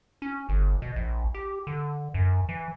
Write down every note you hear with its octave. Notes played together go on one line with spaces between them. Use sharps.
C#4
G1
B2
A#1
G4
D3
F#2
E3